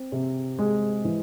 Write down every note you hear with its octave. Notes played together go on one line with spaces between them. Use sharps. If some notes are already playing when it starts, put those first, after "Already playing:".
Already playing: C4
C3
G#3
E3